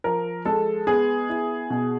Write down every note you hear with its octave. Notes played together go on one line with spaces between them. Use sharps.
F3 A#4
G#3 A4
B3 G#4
E4
B2